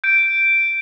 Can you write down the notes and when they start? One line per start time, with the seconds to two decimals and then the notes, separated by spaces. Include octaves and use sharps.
0.04 G6 D7